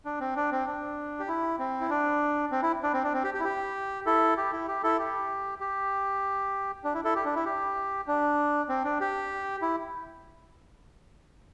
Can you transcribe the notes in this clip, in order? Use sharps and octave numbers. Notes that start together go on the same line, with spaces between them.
D4
C4
D4
C4
D4
G4
E4
C4
E4
D4
C4
E4
D4
C4
D4
C4
G4
G4
E4
G4
E4 A4
G4
E4
G4
E4 A4
G4
G4
D4
E4
E4 A4
G4
D4
E4
G4
D4
C4
D4
G4
E4